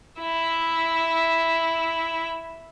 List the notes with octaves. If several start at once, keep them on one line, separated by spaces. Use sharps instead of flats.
E4 E5